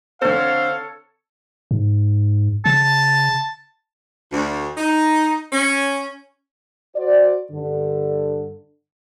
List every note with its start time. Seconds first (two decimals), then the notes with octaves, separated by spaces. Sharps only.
0.22 D3 C4 A4 C5 C#5 F5
1.71 G#2
2.66 C#3 A5
4.32 D2
4.78 D#4
5.52 C#4
6.96 F#4 C5 D5
7.50 G2 D3